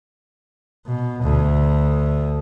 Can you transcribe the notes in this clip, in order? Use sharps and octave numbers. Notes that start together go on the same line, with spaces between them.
B2
D2